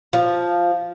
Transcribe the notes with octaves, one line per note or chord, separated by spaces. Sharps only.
F3